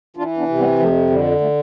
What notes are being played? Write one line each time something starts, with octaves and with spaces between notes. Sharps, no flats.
E3 D4 F4
B3 D4
C3
G3 B3
F2 F3 A3
D3 G3
F3 A3